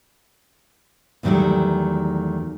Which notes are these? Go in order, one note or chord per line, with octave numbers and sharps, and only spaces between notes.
E2 D3 D#3 F#3 G3 A3